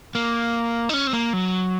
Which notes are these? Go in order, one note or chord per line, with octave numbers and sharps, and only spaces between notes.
A#3
D#4
C#4
C4
A#3
F#3